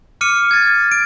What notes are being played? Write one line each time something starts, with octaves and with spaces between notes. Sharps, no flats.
D6 F6 C#7 D#7
G#6 A6
D7